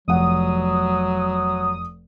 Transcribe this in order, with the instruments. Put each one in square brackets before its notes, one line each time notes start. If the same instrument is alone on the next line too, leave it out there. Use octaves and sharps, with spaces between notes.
[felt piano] F1 F#5 [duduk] F#3 [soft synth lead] D#6